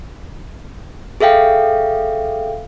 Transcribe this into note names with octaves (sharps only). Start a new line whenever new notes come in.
G#4 A4 E5 F5 G5